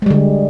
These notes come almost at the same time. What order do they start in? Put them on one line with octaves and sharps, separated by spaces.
G#3 G3 D3